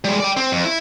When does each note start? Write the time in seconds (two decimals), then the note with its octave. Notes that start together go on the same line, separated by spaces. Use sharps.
0.05 G3 G#3
0.20 D5 G5
0.37 C4
0.52 F2
0.65 E4